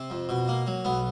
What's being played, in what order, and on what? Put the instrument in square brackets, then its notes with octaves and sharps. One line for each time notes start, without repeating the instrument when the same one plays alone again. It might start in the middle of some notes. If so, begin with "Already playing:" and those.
Already playing: [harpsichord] C3
F2
B2
A#3
F#3
B1 B3